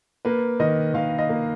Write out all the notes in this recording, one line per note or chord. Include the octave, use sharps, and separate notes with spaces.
A#3 B4
D#3 D#5
D#3 F5
D#5
A#3